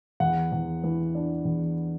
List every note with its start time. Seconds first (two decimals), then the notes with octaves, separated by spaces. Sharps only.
0.20 E2 F#5
0.52 E2
0.84 E3
1.15 D4
1.45 E2